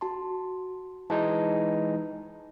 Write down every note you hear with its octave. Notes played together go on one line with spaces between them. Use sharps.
F#4 A5 C6
E3 G#3 D#4 A5